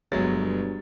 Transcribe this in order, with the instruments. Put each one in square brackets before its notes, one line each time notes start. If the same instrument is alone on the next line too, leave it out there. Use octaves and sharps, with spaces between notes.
[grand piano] G1 G#3 A6 [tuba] G2 [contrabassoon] B2 [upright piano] F#3